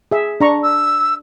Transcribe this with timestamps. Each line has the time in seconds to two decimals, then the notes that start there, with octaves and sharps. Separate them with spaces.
0.11 G#4 E5
0.41 D4 A#5 C#6
0.63 E6